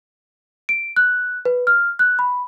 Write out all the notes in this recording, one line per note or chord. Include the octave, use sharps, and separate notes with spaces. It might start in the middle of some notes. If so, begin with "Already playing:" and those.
D7
F#6
B4
F6
F#6
B5